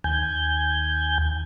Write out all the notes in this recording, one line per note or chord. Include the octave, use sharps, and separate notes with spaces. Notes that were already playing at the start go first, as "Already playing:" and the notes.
D#2 G#5 G6